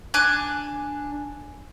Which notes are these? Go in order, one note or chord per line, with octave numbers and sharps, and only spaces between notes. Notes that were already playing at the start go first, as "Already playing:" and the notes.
D4 G#5 D6 F#6